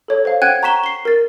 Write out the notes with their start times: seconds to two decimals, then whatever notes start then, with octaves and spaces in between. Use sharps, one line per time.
0.08 A4 C#5
0.25 C5 F5
0.42 F#5 G5 F#6 G#6 D#7
0.63 A#5 C#6 B6 E7 G7
0.84 C7 G7
1.05 A#4 A6